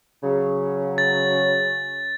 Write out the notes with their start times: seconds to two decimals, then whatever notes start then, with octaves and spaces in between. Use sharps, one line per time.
0.23 C#3 F#3
0.98 A6